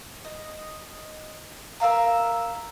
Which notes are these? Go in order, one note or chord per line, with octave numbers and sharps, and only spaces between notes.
D#5
A#4 E5 F5 A#5